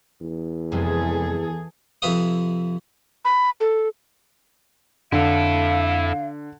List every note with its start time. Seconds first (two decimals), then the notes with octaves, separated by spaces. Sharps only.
0.21 E2
0.72 F2 C3 E3 G#3 G#4 A4
2.02 F2 C3 B4 E5 F5 D#6
3.25 B5
3.60 A4
5.12 F2 D3 E4 A4 F5